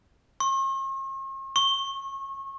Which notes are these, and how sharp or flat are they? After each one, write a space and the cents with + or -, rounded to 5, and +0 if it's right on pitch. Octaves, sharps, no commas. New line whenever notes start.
C#6 -45
C#6 -30